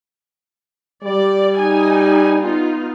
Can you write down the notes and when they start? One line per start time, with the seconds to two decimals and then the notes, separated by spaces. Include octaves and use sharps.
1.03 G3 D5
1.58 D#4 G#5
2.39 B3 D#4 F4